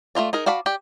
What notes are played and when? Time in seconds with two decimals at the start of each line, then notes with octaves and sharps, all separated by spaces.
0.15 A3 D#4 F4 D5
0.33 D#4 G#4 A#4
0.46 F#4 D5 F5 A5 B5
0.66 G4 D5